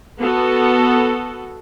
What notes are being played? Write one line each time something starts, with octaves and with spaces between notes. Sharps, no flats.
B3 F#4 A4